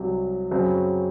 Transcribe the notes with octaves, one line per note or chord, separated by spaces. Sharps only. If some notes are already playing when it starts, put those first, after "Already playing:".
Already playing: C2 C3 F#3
F#2 C#3 F#3 C4